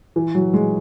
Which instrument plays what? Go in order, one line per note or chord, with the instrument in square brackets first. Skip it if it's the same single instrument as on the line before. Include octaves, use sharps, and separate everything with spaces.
[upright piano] E3
F#3
G#3